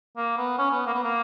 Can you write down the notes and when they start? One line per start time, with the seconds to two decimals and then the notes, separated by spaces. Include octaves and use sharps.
0.17 A#3
0.37 B3
0.58 C#4
0.71 B3
0.86 A#3
0.94 B3
1.04 A#3